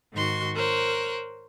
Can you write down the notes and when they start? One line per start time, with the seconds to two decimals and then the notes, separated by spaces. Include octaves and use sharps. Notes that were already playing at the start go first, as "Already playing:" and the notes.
0.13 G#2 D#3 F#4 C6 C#6
0.55 A#4 C5 C#5 F#6